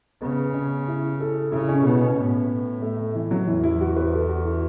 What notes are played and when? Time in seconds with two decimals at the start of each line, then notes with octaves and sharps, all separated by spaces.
0.22 C#3 B3
0.54 C#4
0.88 E4
1.20 A4
1.52 C#3 E4
1.69 C#4
1.84 B2 B3
2.01 C#4
2.18 A2 B3
2.82 A3
2.99 A3
3.15 E3
3.31 F#3
3.47 E2 E3
3.64 E4
3.80 F#4
3.96 B4
4.13 A4
4.29 F#4
4.45 E4